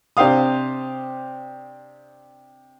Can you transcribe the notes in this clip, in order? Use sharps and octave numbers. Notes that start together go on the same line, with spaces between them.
C3 D4 G4 C5 F5 D#6